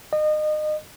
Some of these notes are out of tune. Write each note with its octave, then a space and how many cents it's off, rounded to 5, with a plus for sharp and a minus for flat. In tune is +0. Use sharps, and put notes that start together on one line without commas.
D#5 -30